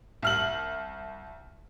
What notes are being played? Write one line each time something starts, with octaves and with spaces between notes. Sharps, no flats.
C2 F6 F#7